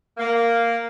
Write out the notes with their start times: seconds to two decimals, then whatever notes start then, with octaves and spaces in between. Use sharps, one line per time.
0.18 A#3